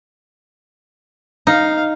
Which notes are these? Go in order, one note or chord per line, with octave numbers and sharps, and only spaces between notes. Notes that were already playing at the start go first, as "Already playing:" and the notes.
D#4 F5